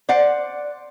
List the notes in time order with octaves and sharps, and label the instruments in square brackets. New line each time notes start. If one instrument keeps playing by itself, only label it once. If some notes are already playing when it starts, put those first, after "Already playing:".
[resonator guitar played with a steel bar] C5 D5 F#5